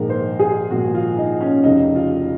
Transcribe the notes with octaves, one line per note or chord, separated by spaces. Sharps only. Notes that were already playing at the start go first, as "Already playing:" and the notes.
Already playing: A#1 G#2 D#3 G#3 A#4
C5
G#4
A#1 G#2 D#3 G#3 F#4
F4
D#4
C#4
F1 F2 C#3 D#4
F4